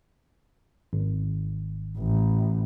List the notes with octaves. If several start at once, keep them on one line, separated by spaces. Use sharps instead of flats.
G#1
A1